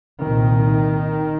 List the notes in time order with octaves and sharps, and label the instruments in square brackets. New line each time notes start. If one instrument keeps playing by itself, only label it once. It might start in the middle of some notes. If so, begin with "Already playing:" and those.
[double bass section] C2 A#2 D#3